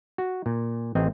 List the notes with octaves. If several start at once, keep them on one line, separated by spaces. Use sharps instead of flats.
F#4
A#2
A1 C4 D#5